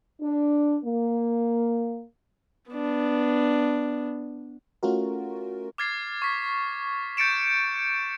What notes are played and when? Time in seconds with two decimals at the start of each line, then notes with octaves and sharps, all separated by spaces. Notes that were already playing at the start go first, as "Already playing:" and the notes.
0.21 D4
0.84 A#3
2.71 B3 D4
4.83 A3 C#4 F4 F#4 A#4
5.78 D6 F6 G#6 A6 C7
6.22 C#6 B6
7.17 G6 A6 C#7 D7 E7